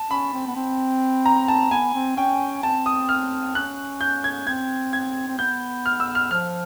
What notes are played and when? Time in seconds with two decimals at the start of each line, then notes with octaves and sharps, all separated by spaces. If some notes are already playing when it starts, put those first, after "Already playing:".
Already playing: A5
0.11 C#4 B5
0.34 C4
0.47 B3
0.56 C4
1.26 A#5
1.48 A5
1.71 B3 G#5
1.94 C4
2.17 C#4 G5
2.63 C4 A5
2.86 D#6
3.09 F6
3.55 C#4 F#6
4.01 G6
4.24 G#6
4.47 C4 G#6
4.93 G#6
5.28 C4
5.39 B3 G6
5.86 F6
6.00 E6
6.15 F6
6.31 F3 F6